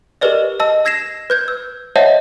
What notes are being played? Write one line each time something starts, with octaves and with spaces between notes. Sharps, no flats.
G4 G#4 A#4 B4 D5 D#5
D#5 A5 E6
E6 G#6 A#6 C7 E7
B4 G6 G#6
E6
C5 C#5 D#5 E5 F#5 A5